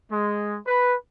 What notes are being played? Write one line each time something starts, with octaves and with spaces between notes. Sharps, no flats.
G#3
B4